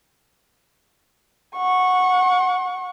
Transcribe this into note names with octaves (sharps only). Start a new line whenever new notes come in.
F#5 C#6